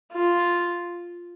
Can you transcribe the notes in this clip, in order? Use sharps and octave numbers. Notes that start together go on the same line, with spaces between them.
F4